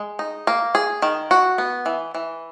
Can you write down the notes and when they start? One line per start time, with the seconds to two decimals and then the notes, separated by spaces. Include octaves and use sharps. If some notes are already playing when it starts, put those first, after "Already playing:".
Already playing: G#3
0.19 D#4
0.47 A#3
0.75 G#4
1.02 D#3
1.31 F#4
1.58 B3
1.86 E3
2.14 E3